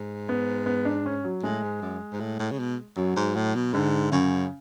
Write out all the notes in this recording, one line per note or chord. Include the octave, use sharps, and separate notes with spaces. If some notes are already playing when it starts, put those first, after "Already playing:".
Already playing: G#2
B3
B3
D4
C#4
F#3
A2 G#3
G#2
F#2
G#2
A2
A2
C#3
B2
F#2 F#3
G#2
A2
B2
G#2 D3
F#2 C#3